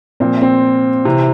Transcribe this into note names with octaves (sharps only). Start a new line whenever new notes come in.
A#2 F3 C4
C4
C3 E3